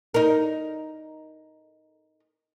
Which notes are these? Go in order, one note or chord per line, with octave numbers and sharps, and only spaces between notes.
D#4 A#4